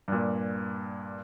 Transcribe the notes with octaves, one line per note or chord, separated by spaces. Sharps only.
G2 A#2